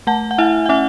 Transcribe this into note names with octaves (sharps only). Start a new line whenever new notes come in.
A3 F#5 A5
F#5
E4 E5 G#5
F#5
C#4 E5 G#5